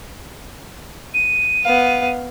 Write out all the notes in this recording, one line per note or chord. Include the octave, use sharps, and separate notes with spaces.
D#7
B3 F5